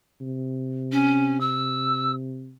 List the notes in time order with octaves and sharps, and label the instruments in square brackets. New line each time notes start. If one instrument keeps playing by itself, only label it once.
[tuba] C3
[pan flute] C#4
E6